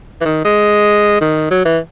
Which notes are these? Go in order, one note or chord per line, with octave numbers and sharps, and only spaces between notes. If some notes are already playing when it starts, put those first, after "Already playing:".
E3
D#3
G#3
D#3
F#3
E3